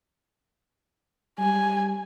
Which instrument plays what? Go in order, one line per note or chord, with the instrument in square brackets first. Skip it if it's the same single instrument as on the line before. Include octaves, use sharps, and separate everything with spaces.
[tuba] G3 [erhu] G#5